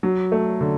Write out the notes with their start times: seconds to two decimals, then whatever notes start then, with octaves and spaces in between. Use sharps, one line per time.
0.03 F#3
0.32 A3
0.61 D3